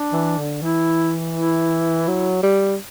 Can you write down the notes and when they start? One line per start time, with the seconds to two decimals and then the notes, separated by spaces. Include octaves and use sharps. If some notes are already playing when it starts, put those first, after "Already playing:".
Already playing: D4
0.13 E3
0.38 D3
0.62 E3 E4
1.34 E4
2.08 F#3
2.43 G3